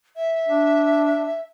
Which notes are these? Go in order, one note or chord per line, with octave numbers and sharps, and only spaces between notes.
E5
D4